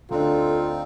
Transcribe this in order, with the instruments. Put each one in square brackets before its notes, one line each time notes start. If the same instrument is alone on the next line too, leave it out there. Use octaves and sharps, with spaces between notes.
[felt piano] D2 D4 [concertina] C4 D#4 [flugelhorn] F4 [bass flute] A4